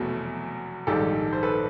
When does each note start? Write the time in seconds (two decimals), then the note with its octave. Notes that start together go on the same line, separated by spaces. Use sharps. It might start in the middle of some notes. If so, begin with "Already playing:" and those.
Already playing: F1 E2 B2 F#3 A3
0.87 A#1 G#2 D#3 G3 G4 A4
1.33 C5
1.43 A4 B4